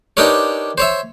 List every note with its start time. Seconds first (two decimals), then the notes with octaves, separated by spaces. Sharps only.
0.17 D4 D#4 G4 A#4 B4 C#5
0.78 C5 C#5 E5